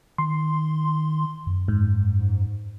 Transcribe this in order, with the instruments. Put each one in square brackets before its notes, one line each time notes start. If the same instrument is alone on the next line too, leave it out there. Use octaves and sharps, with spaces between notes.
[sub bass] D#3 [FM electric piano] C6
[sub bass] F#2
[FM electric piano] G#2